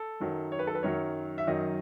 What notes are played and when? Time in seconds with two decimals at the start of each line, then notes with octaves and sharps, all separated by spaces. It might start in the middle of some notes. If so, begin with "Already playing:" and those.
Already playing: A4
0.20 F#2 D#3 F#3
0.52 C#5
0.59 B4
0.67 A4
0.75 B4
0.83 F#2 D#3 F#3 C#5
1.38 E5
1.47 F#2 D#3 F#3 D#5